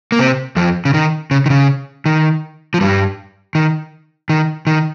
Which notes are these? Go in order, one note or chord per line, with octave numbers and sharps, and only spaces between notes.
A#3
C3 C4
F2 F3
C#3
D#3
C#3
D#3
C#3
D#3
F3
G2 G3
D#3
D#3
D#3